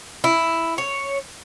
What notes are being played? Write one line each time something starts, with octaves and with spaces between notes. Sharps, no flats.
E4
C#5